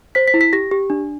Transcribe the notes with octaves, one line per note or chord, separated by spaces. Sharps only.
C5 B6
B6
E4
B6
G4 A#6
G4
D4